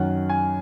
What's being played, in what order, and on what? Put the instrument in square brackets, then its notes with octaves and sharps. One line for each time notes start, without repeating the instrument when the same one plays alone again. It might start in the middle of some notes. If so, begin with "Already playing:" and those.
Already playing: [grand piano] F#2 D#3 F#3 F#5
G#5